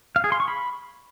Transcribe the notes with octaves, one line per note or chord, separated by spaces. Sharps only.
F5
G#4
C6
C#6
B5